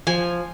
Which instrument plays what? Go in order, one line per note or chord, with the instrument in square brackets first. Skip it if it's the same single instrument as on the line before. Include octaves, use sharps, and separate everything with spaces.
[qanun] F3 G#5